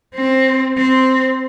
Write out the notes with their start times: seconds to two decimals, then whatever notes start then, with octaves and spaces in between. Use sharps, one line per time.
0.14 C4
0.77 C4